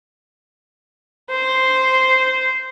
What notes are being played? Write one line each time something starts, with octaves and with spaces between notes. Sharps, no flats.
C5